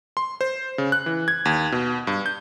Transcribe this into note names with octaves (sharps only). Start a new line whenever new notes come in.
C6
C5
C#3
F#6
E3
G#6
D#2
B2
G2
G6